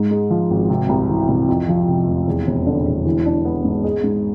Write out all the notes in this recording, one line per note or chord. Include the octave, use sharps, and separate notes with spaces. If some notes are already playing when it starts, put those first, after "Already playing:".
Already playing: G#2
G#3
F3
G#1
C3
C2
E3
C2
F2
F3
C3
F1
E2
E1
D3
E1
E3
D4
B3
G#2
G#3
G#2